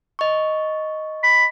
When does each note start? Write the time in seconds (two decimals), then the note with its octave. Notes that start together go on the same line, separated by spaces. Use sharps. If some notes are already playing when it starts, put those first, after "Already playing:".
0.19 D#5 C#6
1.23 B5